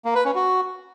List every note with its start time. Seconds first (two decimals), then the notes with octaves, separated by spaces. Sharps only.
0.05 A#3
0.15 B4
0.25 C#4
0.35 F#4